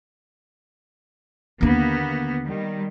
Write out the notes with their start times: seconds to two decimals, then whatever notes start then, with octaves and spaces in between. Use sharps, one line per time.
1.61 D#2 D3 A#3 B3
2.45 D#3 G3